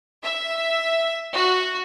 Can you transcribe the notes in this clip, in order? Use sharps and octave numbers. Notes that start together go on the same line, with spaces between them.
E5
F#4